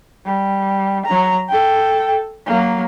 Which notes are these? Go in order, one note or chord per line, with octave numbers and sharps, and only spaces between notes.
G3
F#3 A#5
A4 G5
F#3 A#3